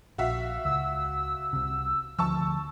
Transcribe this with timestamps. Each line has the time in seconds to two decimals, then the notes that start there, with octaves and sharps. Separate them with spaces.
0.18 A#1 F#4 E5 F5
0.65 C#2 E6
1.53 C2 C3
2.19 D2 F3 A5 C#6 E6